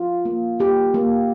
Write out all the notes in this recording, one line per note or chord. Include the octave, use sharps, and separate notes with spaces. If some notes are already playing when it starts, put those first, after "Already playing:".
Already playing: F4
A#3
A#3 G4
A#3